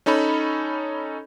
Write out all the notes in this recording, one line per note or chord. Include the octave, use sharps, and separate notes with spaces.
C#4 D#4 A4 C#5 B5